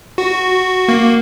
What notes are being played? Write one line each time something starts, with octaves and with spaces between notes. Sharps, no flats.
F#4
A#3